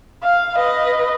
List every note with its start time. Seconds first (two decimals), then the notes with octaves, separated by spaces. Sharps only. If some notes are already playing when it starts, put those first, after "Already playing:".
0.23 F5
0.56 B4 D#5